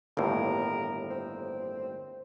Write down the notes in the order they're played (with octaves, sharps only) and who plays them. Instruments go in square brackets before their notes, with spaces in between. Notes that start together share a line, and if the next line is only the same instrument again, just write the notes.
[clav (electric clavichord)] G1 D#2 A2 [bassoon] A#4
[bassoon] C4